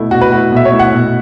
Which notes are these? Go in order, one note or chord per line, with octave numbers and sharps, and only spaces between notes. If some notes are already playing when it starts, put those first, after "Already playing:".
Already playing: B2 A3 E4
B2 F#4
B4
A3 E4 F#4
B2 E5
C#5
A3 E4
F#5
B2